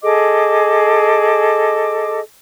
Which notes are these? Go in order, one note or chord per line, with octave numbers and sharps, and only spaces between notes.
G#4 A4 D#5 D6